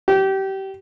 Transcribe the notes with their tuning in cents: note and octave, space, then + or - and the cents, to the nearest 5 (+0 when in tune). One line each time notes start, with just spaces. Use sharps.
G4 -25